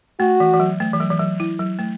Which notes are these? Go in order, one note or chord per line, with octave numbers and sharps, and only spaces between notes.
A3 F#4
E3
E3
F#3
A3
E3
F#3
E3
F#3
E4
F#3
A3